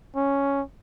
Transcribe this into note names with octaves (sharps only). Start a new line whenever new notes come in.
C#4